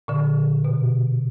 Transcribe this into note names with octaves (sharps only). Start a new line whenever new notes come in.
A#2 D3
B2